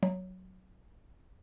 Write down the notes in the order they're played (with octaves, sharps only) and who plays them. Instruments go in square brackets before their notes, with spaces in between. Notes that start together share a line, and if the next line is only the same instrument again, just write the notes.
[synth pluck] F#3